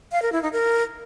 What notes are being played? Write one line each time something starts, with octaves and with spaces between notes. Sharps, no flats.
F5
A#4
E4
D#4
A#4